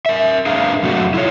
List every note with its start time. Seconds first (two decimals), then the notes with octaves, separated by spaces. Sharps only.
0.06 A#4 E5
0.46 D4 G#4 A#4 B4 F5
0.83 F2 C3 F#3 A3 F#4
1.14 E4 F4 C#5